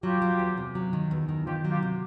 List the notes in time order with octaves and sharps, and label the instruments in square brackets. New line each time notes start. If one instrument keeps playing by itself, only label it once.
[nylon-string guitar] F#3 [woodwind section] F4 G4
[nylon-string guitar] F#3
E2
C3
F#3
D#3
E2
D#3
[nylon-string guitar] D#3 [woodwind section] F4 G4
[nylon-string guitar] F#3
[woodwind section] F4 G4
[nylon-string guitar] C3